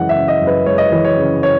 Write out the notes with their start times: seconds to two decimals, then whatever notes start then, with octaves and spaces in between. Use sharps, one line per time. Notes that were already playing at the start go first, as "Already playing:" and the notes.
Already playing: F#2 C#3 E3 G#3 F#5
0.09 E5
0.15 C#3
0.28 D#5
0.41 F#2
0.47 B4
0.66 G#3 C#5
0.78 D#5
0.89 E3 C#5
1.05 C#5
1.18 C#3
1.43 C#5